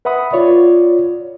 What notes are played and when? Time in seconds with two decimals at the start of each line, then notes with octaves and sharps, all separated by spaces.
0.05 B4 E5 F#5 B5 D#6
0.33 F4 C#5 D5